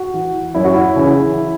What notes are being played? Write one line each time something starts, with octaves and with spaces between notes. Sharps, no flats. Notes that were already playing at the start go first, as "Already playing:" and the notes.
Already playing: F#4
E3
F#2 E4
F#4
E4
C#3 E3